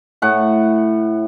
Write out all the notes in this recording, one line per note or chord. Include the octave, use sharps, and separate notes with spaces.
A2 F#5 A5